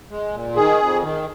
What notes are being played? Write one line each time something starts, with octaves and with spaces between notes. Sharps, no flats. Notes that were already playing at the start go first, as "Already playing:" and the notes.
G#3
A#2
D#3 G#4
F2
D#3